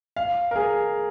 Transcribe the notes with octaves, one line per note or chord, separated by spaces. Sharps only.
F5
A#4
G#4